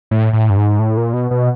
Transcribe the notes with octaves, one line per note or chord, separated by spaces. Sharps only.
A2
A2
G2
G#2
A2
A#2
B2
B2